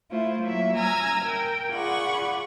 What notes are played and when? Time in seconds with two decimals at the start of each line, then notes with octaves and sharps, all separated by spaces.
0.11 A3 E4 F4 C5
0.42 F#3 A#3 E4 E5
0.76 G#5 A#5 E6 F6 G#6 A#6
1.25 A#4 G5
1.73 F4 G#4 D5 F#5 B5 C#6